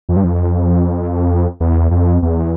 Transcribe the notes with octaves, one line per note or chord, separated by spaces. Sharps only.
F2
G2
F2
E2
F2
E2